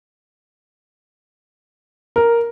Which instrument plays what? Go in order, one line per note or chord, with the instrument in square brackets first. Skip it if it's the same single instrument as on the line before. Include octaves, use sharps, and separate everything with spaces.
[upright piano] A#4